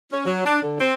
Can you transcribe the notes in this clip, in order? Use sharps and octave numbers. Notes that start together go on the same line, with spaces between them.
C#4
F#3
D4
D3
C4